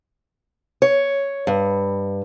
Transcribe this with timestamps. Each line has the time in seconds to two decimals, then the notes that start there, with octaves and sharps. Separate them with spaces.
0.82 C#5
1.47 G2